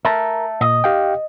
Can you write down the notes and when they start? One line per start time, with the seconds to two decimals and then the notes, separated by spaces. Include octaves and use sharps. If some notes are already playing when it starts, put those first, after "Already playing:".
0.05 A#4 E5 A5
0.61 A#2 D#5
0.84 G4 F5 G5